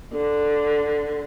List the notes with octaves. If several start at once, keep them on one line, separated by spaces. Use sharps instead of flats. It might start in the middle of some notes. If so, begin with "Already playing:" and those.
D3